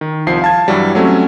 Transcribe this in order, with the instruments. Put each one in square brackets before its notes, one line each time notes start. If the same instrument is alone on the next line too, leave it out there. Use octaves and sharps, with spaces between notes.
[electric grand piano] D#3
C2 F3 C7
F5 A5 G#6
G2 E3 F#3 G3
F#3 A3 C4 C#4